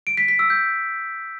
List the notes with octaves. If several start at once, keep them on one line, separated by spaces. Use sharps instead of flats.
D7
B6
B6
E6
G6